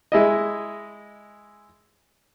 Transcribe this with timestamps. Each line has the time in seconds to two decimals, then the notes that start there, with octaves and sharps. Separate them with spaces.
0.12 G#3 E4 D#5